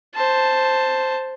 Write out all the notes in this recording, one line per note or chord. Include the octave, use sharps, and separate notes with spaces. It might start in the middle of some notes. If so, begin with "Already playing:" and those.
C5 A5